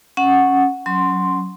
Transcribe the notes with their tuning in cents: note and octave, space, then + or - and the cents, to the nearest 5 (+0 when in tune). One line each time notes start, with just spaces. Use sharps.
C#4 -5 F#5 +0
F#3 +0 C#4 +5 C6 +0